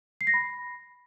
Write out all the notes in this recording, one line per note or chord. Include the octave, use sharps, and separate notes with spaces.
C7
A#6
B5